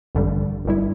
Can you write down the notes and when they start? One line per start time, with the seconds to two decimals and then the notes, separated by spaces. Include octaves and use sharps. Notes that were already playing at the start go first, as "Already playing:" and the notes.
0.15 A1 G2 D3 G3
0.65 G1 G2 G3 E4